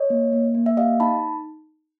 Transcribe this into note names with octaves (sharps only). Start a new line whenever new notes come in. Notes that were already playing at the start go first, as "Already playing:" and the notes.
Already playing: C#5 D#5
A#3
A#3
A#3
E5
G4 D#5 F5
D#4 A5 B5